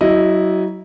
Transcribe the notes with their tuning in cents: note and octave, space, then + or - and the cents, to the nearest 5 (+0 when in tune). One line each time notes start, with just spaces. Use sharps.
F#3 +25 E4 -10 D#5 +0